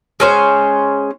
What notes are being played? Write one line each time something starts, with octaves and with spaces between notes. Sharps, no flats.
G#3 C#4 C5